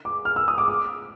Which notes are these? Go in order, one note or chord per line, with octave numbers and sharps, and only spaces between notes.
D6
F6
E6
D#6
D6
D6